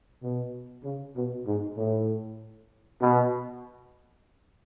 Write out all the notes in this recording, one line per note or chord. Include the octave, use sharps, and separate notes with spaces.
B2
C#3
B2
G#2
A2
B2